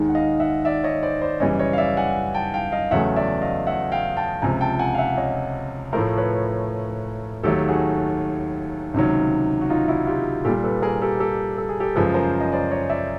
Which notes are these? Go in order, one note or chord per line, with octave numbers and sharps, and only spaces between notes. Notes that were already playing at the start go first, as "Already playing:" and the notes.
Already playing: D#2 D#3 G#3
F#5
D#5 F5
E5 F#5
D5 E5
C#5 D#5
C5 D5
C5 D5
F#2 C#3 E3 G3 C#5 D#5
C#5 D#5
F5
D5 E5
F#5 G#5
G5 A5
F5 G5
D#5 F5
E2 C#3 F#3 A3 E5 F#5
D5 E5
D#5 F5
E5 F#5
F5 G5
G5 A5
C#2 C3 F3 G#5 A#5
G5 A5
F#5 G#5
F5
E5 F#5
C#5 D#5
A2 F3 A3 A#4 C5
B4 C#5
D#2 D#3 F#3 A3 G4 A4
F#4 G#4
C#2 C3 D#3 F#3
F#4
D#4 F4
E4 F#4
F4 G4
A#2 G3 G4 A4
A4 B4
G#4 A#4
G4 A4
G4 A4
A4
G#4
G4 A4
F#2 C#3 F3 G#3 A4 B4
A#4 C5
D#5
C5 D5
C#5 D#5
D5 E5